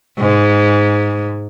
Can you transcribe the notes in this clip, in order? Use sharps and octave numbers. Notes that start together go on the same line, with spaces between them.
G#2